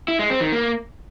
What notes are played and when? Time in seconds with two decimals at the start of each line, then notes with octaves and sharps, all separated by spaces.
0.08 E4
0.19 G#3
0.30 C4
0.41 D#3
0.52 A#3